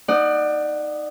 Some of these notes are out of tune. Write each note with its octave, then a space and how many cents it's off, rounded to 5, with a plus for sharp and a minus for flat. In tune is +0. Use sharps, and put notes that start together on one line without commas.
D#4 +0 D5 +25 F#5 +0